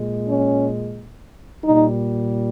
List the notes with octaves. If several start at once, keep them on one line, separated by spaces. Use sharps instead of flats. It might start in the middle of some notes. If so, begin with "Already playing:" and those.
Already playing: A#2 G#3
C#4
A#2 G3 D#4